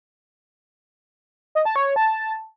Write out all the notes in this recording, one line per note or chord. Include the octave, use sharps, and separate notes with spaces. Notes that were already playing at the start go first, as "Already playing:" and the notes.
D#5
A5
C#5
C#5
A5